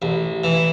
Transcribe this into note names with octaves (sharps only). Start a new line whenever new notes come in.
A1
E3